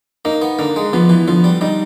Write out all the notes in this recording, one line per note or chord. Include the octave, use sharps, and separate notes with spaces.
A#3 D#4
B3
D3 A#3
G#3
F3 B3
E3
D3 F3
G3
G3 D#4